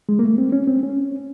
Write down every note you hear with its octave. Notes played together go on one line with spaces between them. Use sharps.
G#3
A#3
A3
C4
C#4
C4
C#4